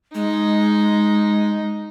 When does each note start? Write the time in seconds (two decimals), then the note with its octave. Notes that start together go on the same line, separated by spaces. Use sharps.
0.15 G#3 D#4